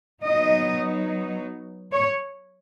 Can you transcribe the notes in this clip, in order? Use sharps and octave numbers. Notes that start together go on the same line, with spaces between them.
F#3 B3 D#4 D#5
C#5